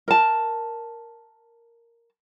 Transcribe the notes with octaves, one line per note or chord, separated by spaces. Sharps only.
A#4 A5